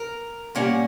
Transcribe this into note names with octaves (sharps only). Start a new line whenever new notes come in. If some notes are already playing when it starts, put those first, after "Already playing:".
Already playing: A#4
A#2 G3 A#3 C#4 F#5